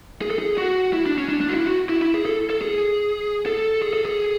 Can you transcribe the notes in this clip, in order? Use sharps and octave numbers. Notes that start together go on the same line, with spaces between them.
G#4
A4
G#4
F#4
E4
D4
C#4
D4
D4
F#4
E4
F#4
E4
E4
G#4
A4
A4
G#4
A4
G#4
A4
G#4